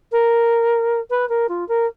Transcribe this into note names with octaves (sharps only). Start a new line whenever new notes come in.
A#4
B4
A#4
F4
A#4